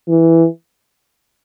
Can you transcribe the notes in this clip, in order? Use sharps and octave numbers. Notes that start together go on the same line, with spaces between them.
E3